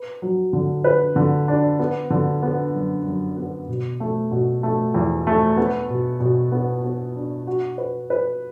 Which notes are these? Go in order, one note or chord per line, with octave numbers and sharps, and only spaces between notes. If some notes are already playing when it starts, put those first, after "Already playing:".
Already playing: B4
F#3
D3
B4
D3
D4
B3
D3
B3
F#2
F#2
B3
B2
A3
B2
A3
E2
A3
B3
B2
B2
B3
B3
D4
F#4
B4
B4